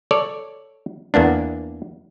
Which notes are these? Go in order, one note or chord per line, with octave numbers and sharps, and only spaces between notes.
A4 C#5 D5
E2 A#3 B3 D4